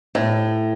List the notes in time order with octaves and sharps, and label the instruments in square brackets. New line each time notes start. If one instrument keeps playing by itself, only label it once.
[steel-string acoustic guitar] A2